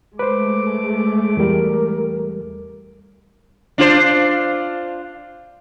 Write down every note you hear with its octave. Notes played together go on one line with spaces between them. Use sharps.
G#3 A3 B4 C5 D6
E2 G3 A#4
D4 F4 C5